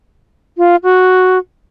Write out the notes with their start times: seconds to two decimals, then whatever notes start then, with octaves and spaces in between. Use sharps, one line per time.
0.58 F4
0.83 F#4